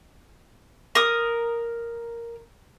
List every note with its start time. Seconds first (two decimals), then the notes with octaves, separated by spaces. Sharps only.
0.95 A#4 D#6